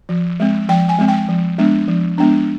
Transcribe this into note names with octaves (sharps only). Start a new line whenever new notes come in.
F3
G#3 C4
F3 G5
G#5
G#3 C4
G5
F3
G#3 B3 D4
F3
G#3 B3 D4